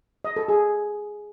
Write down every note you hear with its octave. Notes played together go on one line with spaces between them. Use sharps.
D#5
A4
G#4